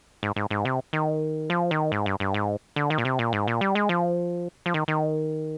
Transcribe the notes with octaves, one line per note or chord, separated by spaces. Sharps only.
G#2
G#2
G#2
C3
D#3
F3
D#3
G#2
G2
G2
G#2
D3
D#3
A#2
C3
A#2
G#2
A#2
G3
G#3
F3
F3
D#3
D#3